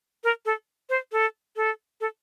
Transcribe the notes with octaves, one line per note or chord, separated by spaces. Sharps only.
A#4
A4
C5
A4
A4
A4